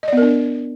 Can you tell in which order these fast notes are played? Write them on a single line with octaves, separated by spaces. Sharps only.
D#5 D5 B3 A#4 D4